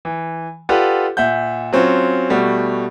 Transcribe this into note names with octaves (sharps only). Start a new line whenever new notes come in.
E3
F4 G4 A4 B4 D5 F#5
A#2 E5 F#5 G6
F#3 C4 C#4 F4
B2 G3 A3 F#4